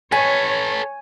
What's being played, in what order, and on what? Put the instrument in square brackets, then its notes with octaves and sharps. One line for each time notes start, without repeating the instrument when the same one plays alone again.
[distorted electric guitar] A4 B4 [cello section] C#5 [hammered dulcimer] G#5